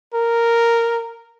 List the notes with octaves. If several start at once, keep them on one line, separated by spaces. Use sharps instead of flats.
A#4